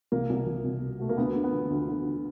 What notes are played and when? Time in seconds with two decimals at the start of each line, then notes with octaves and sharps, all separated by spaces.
0.12 C2 A#3
0.30 C2
0.47 C2
0.65 C2
0.82 B2
1.00 B2 A3
1.09 A#3
1.17 D2 B3
1.36 D3
1.44 B3
1.53 D3
1.70 D2
1.88 D3
2.06 D3